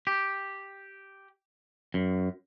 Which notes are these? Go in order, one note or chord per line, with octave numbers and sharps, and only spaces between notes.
G4
F#2